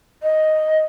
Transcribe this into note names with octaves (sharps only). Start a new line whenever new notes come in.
D#5